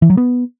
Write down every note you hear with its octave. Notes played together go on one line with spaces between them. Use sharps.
E3
F#3
B3